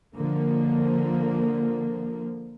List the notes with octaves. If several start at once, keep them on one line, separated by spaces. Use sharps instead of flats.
D3 F3 A#3